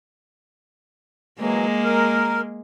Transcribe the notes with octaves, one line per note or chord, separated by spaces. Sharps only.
E3 F#3 G#3 A#3
A#4